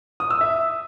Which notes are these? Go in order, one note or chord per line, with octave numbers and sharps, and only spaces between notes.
D#6
E6
E5